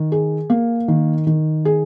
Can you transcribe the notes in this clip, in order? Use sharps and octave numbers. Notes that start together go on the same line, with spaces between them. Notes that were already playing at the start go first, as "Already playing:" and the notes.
Already playing: D#3
G#4
A#3
D#3
D#3
G#4